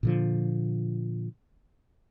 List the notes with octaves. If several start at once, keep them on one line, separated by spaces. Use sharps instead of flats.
A#2 D3 F3